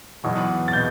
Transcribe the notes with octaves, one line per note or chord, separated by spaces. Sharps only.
E2 B2 F#3
A6
B2 G6